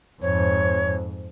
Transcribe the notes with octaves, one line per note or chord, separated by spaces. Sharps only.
F2 G#2 C#5